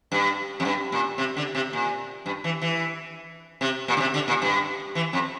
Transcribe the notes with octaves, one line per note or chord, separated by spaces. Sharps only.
G2
F2
G2
A#2
C3
D3
C3
A#2
G2
E3
E3
C3
A#2
D3
C3
D3
A#2
G2
E3
F2